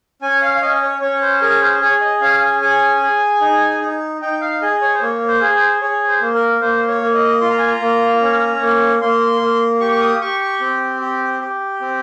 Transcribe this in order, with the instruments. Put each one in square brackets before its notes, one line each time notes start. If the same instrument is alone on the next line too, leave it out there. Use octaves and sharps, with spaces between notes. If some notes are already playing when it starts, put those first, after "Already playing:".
[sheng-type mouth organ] C#4 G#5
F5
F5
C#4 D#5
C#5
C#4 C#5
C5
G#4 A#4
C5
G#4 C#5
D#5
C#4 F5
G#5
G#4 G#5
G#4
D#4
D#4
D#4 G5
F5
G#4 D#5
C#5
C5
A#3 C#5
C5
G#4
C5
G#4 C#5
C5
A#3
A#4
A#3 C5
C#5
A#3
D#5
F4 C6
A#5
G#5
A#5
A#3
C#4
A#3
A#3 C6
A#3
G4 C#6
C#6
D#6
G4 C#6
C#6
C4
G4
G4
C4